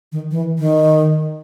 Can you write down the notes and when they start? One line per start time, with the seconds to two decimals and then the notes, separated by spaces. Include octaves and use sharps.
0.12 D#3
0.31 E3
0.59 D#3